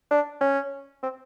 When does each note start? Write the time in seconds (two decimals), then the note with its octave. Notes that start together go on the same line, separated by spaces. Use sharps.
0.11 D4
0.41 C#4
1.03 C4